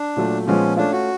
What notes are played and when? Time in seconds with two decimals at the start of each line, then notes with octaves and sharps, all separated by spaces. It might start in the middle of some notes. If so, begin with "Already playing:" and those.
Already playing: D4
0.16 A#2 F#3 A3
0.46 A#2 F3 G#3 B3 C#4
0.77 A3 C#4 D4 F4
0.92 F#4